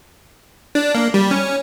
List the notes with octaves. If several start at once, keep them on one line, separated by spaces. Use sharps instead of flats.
D4
A#3
G3
C#4